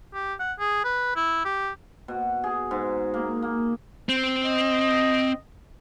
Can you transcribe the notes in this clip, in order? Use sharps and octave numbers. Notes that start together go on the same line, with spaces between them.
G4
F#5
G#4
B4
E4
G4
B2
G#4
G#2
A#3
A#3
C4
D#5